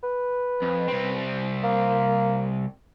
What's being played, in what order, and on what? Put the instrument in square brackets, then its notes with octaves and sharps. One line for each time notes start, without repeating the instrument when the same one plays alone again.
[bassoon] B4
[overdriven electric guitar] F2
C2 C4
[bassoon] A#3